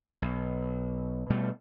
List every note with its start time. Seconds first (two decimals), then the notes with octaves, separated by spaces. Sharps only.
0.22 B1
1.30 B2 G3 A3